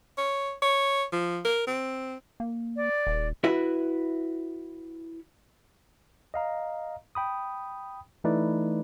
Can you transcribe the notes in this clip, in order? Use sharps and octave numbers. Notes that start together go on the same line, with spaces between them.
C#5
C#5
F3
A#4
C4
A#3
D5
D#1
E4 F#4 B4 E5
D#5 F5 A#5
G5 B5 D#6
E3 A3 D#4 E4 B4 D5